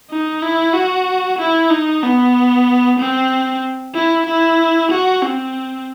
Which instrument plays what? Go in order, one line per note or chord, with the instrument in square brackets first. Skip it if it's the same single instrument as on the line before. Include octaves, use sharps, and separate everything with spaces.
[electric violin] D#4
E4
F#4
E4
D#4
B3
C4
E4
E4
F#4
C4